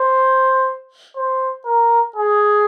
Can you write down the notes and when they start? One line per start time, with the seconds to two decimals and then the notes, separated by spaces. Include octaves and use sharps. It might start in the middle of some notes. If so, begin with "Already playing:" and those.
Already playing: C5
1.17 C5
1.66 A#4
2.16 G#4